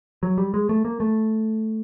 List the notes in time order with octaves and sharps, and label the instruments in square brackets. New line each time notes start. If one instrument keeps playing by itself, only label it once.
[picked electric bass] F#3
G3
G#3
A3
A#3
A3